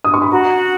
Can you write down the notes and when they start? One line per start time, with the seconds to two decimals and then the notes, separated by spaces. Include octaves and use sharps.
0.04 D#6
0.14 C#6
0.22 B5
0.31 F#4 A#5